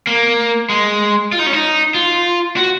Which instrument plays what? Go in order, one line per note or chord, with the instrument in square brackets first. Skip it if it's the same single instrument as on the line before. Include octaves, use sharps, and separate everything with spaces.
[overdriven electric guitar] A#3
G#3
F4
D#4
C#4
D#4
F4
F#4